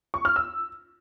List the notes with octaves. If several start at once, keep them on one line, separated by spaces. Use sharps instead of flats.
C#6
F6
E6